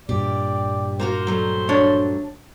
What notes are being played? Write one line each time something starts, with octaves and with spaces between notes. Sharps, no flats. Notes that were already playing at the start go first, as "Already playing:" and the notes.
G2 A#2 G4 D5
A#3 F4 F#4 C5
F#3 G3 A3
D4 C#5